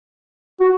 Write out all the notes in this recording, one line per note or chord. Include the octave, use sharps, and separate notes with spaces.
F#4